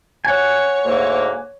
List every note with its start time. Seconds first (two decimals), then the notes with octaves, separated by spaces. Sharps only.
0.25 C#5 F#5 G#5
0.85 D2 G#2 A#3